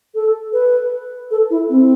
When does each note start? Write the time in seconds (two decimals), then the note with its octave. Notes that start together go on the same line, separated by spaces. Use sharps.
0.15 A4
0.53 B4
1.31 A4
1.50 E4
1.70 C4